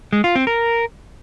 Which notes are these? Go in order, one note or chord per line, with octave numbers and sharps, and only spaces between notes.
G#3
F4
C4
A#4